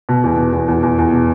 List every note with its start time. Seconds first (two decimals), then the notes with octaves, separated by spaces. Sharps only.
0.09 B2
0.24 E2
0.38 B2
0.53 E2
0.68 E2
0.83 E2
0.98 E2
1.12 B2